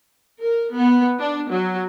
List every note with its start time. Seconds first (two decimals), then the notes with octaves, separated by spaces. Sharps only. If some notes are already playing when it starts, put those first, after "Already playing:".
0.39 A#4
0.73 B3
1.19 D4
1.50 F#3